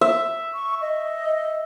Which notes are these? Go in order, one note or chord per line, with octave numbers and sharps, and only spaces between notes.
E5
C#6
D#5